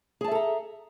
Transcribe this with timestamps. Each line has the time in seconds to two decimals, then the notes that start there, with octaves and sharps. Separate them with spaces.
0.21 G#4
0.24 A5
0.28 E5
0.31 A4
0.35 A#5